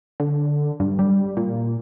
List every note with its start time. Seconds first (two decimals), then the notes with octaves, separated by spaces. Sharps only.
0.20 D3
0.80 G2
0.99 G3
1.37 A#2